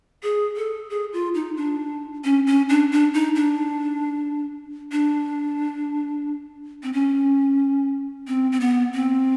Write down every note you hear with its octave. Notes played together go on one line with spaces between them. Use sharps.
G#4
A4
G#4
F4
D#4
D4
C#4
C#4
D4
D4
D#4
D4
D4
C4
C#4
C4
C4
B3
C4